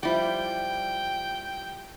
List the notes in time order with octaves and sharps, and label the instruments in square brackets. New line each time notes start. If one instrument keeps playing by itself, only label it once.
[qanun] F3 D5 [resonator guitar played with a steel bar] G3 E4 [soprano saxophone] G5